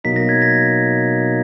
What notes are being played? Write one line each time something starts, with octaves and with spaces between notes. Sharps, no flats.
B2 F#3 A#3 D#4 B6
A#6
G#6
A#6
A#6